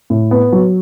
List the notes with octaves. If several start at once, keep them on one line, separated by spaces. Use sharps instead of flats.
A2
B3
F#3